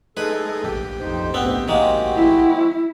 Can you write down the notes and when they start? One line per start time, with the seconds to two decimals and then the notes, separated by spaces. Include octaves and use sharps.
0.17 G#3 D#4 G#4 A4 B4
0.63 A#1 G4
1.00 F2 D#4 C5
1.34 D2 G#2 B3 C4
1.68 D#3 G#3 A#3 C4 F#4
2.16 E4